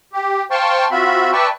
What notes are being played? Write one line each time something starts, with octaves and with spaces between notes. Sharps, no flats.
G4
C5 F5 G5 A5 C6 C#6
C4 F4 F#4 E5 B5
B4 D5 E5 G5 A5 C#6